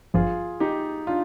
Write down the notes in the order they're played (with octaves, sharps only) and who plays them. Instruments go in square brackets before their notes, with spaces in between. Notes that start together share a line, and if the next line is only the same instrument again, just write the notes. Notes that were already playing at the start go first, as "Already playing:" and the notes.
[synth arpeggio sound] G#1 G2 F3 [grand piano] F4 G#4
[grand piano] D#4 G4
D4 F4